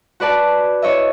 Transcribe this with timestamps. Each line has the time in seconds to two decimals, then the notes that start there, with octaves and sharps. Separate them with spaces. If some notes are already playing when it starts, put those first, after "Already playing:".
0.20 F#4 B4 D5 A5
0.82 E4 C#5 D#5 E5